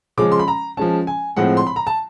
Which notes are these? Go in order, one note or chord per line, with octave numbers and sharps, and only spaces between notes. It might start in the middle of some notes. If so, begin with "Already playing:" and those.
C#3 F3 G#3 C#4 D6
C6
B5
A#5
F3 G#3 C#4 A5
G#5
A2 F3 G#3 C4 F#5
C6
B5
A#5
A5